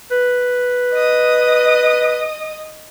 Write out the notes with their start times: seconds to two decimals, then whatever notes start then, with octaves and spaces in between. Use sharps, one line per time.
0.11 B4
0.93 D#5 D#6